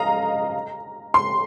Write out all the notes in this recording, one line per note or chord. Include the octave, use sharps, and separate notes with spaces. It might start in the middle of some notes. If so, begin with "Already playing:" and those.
Already playing: D#5 F5 A#5
C6